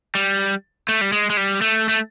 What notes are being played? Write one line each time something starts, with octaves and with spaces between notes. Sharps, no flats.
G3
A3
G3
G#3
G#3
G3
A3
A3